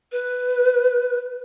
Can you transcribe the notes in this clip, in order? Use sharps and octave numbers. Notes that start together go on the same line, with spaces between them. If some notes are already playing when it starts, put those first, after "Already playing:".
B4